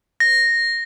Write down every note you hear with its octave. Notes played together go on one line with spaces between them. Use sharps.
A#6